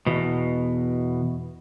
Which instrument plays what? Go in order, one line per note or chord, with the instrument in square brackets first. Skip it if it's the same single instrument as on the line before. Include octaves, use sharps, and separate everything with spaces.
[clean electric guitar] E2 B2